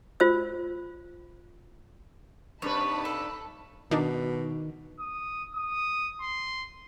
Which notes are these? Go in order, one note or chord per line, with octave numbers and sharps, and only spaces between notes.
F4 C5 E6
G2 C3 D#4 B4 C#5 A5 B5
A4
B2 D#3 D4 D#4
D#6
D#6
C6